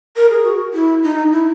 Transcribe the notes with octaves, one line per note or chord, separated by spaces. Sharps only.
A#4
G#4
F#4
E4
D#4
E4